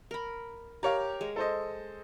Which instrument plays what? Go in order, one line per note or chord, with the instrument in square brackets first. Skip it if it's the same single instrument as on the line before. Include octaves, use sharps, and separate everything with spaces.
[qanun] A#4 B5
[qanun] G4 [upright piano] A#4 C#5 F5
[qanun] G#3
[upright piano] A4 C5 D#5